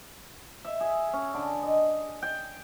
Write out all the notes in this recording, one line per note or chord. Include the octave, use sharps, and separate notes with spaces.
E5
G#4
C#4
D3
D#5
G5